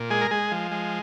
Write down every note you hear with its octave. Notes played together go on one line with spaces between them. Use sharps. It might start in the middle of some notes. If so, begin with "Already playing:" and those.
Already playing: A#2
G#3 G#4
A#4
G#3 G#4
F3
G#3